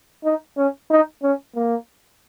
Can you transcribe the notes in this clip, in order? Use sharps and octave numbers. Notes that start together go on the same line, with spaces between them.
D#4
C#4
D#4
C#4
A#3